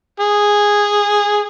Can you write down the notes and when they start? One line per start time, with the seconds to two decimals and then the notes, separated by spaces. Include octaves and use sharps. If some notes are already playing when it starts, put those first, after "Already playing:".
0.20 G#4